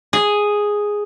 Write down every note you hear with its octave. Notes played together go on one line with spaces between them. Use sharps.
G#4